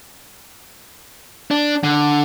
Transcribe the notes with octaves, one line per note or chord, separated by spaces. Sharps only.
D4
D3